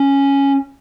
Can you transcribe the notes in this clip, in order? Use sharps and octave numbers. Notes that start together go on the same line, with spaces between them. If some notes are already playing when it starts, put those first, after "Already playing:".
Already playing: C#4